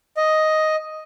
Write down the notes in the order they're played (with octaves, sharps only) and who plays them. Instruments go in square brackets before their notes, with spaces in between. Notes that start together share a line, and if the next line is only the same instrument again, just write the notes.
[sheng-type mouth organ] D#5